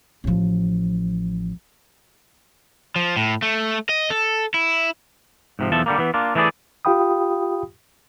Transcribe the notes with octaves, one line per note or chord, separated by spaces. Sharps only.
A1 F3
F3
A2
A3
D#5
A4
E4
G#2 C3 F3
B1 E2 E3 F3 A4 E5
D3 G3 A#3
E3 B3
A#3 D4 F4
E3 A3 E4 F4 G#4 D5
F4 G4 F5 G5 B5 D#6